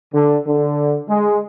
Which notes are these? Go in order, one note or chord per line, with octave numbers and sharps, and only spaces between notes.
D3
D3
G#3